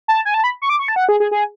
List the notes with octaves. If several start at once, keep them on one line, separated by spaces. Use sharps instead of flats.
A5
G#5
A5
B5
C#6
D6
C#6
A5
F#5
G#4
G#4
G#4